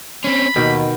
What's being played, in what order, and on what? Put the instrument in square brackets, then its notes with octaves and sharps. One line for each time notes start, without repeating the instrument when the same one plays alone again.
[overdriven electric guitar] C4 C#4 [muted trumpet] B5
[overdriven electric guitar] D#2 [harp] B2 [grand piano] D#3